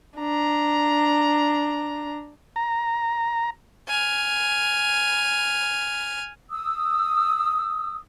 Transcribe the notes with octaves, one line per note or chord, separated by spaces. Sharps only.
D4 A#5
A#5
G#5 F6
D#6 E6